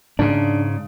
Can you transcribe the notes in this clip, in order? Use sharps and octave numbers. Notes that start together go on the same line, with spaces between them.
G#2 C#3 D4